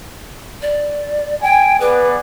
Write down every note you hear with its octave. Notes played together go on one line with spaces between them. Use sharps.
D5
G5 G#5
B3 G#4 B4 D5